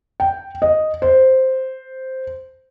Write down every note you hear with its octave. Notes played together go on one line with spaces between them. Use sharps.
G5
D#5
C5